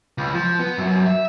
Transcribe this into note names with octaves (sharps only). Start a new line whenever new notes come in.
C#2
F3
B3
F#2
E5